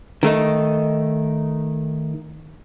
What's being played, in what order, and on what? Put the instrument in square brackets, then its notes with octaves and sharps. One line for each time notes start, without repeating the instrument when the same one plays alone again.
[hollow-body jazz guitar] D#3 A3 D#4